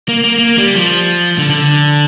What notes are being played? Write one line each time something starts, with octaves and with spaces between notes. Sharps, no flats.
A#3
A#3
A#3
G3
F3
D3
D3